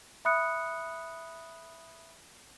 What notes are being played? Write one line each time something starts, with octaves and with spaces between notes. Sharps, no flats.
E5 B5 D#6 F#6 C#7